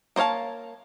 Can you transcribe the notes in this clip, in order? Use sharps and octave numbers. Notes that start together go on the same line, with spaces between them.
A#3 C5 C#5 F5 A5